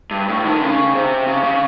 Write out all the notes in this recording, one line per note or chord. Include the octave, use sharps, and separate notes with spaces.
G2
A2
D#3
D3
C#3
C3
C#3
C#3